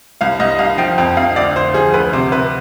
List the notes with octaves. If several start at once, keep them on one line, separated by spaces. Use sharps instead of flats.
C2 F5
C2 D#5
C2 F5
F3 G5
F2 G5
F2 F5
D2 D5
D2 C5
F3 G#4
D2 B4
C3 C5
C3 B4